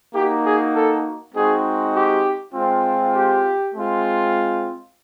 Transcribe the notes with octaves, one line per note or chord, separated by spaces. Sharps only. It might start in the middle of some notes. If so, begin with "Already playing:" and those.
A#3 D#4 F#4 G4
G#4
A4
G#3 C4 D#4 F#4 G#4
G4
G#3 C4 F4
G4
G#3 C4 F4